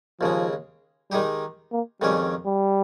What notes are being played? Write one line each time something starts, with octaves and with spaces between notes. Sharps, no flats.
D#2 C#3 F3 G#3
D#3 G3 G#3 D#4 G4
A#3
F2 D#3 G3 G#3 C#4 G4
G3